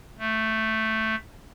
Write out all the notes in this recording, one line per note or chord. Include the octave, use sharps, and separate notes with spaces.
A3